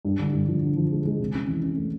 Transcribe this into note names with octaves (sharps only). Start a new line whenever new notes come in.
G2
D3
G2
F3
D3
F3
G#3
G#3
C3
C#4
E3
C#4
A3